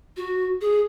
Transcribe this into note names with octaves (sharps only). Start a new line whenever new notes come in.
F#4
G#4